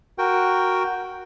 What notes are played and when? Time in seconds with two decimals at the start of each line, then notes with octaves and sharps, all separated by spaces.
0.18 F#4 A#4 G5